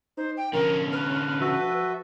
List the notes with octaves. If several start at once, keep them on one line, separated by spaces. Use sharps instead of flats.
D#4 C5
G5
D3 F3 C#4 A#4
B4 F6
F3 F#4 A4 E5